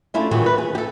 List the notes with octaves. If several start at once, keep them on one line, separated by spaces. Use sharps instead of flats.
A3 C#4 D4 E4 F4
A#2 D#3 E3 F#3 F#4 G#4
B4
G#4
G4 A4